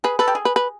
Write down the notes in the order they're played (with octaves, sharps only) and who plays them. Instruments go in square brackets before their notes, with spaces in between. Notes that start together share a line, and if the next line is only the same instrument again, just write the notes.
[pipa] G#4 [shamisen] B4
[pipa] A4 [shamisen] B4
[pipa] G4
G#4
[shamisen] B4
B4